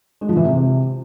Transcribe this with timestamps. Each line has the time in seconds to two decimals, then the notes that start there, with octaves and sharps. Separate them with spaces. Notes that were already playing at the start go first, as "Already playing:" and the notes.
0.21 G#3
0.29 F3
0.37 E3
0.44 C3